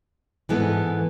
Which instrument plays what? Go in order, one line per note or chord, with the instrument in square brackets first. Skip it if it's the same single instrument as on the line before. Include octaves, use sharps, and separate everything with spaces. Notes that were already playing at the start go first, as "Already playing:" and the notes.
[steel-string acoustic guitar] G#2 E3 B3 E4 A4